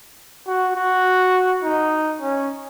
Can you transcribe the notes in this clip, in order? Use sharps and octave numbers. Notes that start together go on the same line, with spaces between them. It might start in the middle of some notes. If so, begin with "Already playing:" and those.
F#4
F#4
D#4
C#4